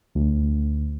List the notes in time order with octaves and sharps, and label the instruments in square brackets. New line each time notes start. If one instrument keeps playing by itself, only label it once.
[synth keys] D2